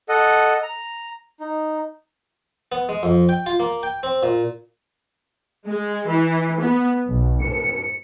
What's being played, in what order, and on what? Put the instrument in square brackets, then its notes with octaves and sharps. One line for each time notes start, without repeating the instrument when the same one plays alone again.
[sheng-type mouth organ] A4 D#5 F#5
A#5
D#4
[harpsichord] B3
G#3
F2
G5
F4
A#3
G5
C4
A#2
[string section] G#3
E3
B3
B1
C#7